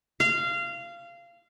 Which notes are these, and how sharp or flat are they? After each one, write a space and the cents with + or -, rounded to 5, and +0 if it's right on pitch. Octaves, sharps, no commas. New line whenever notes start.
F5 -20